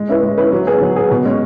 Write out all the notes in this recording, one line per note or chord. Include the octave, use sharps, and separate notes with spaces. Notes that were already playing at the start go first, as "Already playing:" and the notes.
Already playing: G#3
C#4 E4 B4
G#3
C#4 E4 B4
F#3
B3 G#4
F#3
B3 G#4
B2
G#3 C#4